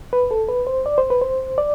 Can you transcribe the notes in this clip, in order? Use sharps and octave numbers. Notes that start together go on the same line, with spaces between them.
B4
A4
B4
C5
D5
C5
B4
C5
D5